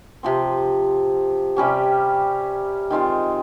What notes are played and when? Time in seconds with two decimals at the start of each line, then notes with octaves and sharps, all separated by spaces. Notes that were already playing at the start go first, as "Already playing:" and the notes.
0.23 C3 F3 C4
1.56 C3 G3 C#4 G4
2.90 D#3 G#3 C4 F4